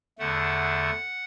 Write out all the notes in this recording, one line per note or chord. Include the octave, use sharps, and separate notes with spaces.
E2 D3 A3 F#5